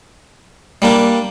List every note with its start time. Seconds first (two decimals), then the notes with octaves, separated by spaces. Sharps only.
0.82 G3 A#3 D4